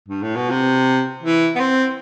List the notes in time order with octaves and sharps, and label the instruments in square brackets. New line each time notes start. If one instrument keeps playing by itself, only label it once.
[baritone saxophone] G2
A2
B2
C3
E3
B3
C4